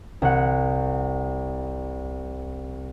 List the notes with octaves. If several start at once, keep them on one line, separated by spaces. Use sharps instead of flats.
C2 F#5